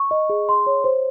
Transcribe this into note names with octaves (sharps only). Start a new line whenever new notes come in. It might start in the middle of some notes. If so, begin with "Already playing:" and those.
Already playing: C#6
D#5
G#4
C6
C#5
C5